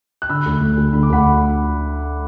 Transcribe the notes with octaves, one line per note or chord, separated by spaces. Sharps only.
F#6
D3 B5 E6
D2
A3
D2
D3 B5
D6
D2 F#5 B5